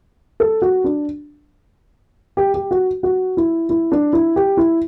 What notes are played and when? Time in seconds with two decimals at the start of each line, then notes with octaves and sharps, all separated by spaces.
0.40 A4
0.62 F#4
0.84 D4
2.37 G4
2.54 G4
2.71 F#4
3.03 F#4
3.37 E4
3.70 E4
3.92 D4
4.13 E4
4.36 G4
4.57 E4